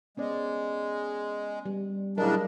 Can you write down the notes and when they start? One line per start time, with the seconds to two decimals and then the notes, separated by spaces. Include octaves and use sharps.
0.17 G#3 B3 C#4 D5
1.66 G3
2.17 A2 C#3 F#3 D4 A#4 D#5